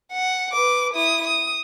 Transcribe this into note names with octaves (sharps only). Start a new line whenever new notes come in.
F#5
B4 D6
E4 D#6
D#6